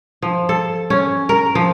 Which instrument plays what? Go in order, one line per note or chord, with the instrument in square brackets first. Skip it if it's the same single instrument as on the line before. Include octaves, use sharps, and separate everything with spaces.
[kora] F3
A4
C#4
A#4
F3